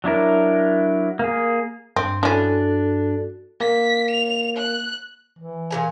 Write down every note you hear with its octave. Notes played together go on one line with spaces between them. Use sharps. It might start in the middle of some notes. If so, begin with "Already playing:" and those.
F#3 D4 E4 A#4
A#3 G#4
G2 C4
E3 C#4 D4 F#4 A4
A#3 B6
F7
F#6
E3
A#2 G3 G#5